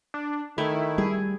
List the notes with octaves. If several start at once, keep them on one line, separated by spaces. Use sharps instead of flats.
D4
D#3 A3 E4
G3 G#4